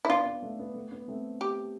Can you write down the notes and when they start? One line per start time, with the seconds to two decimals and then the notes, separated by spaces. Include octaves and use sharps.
0.05 E4
0.08 B3 D4 F4
0.26 B3
0.42 A3
0.59 B3
0.75 A3
0.92 B3
1.08 A3 C4
1.41 G4